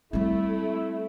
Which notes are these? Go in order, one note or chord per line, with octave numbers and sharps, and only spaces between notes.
G3 A3 C4 E4